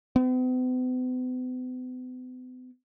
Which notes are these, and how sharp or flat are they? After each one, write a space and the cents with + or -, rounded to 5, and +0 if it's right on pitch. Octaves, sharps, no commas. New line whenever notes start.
B3 +45